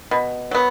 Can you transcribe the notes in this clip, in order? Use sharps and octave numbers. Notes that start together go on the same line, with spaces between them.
B2
F#3 B3